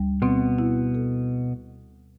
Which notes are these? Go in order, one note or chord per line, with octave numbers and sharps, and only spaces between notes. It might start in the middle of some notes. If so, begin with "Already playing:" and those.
Already playing: D2 G3
B2 B3 C4
E4
A4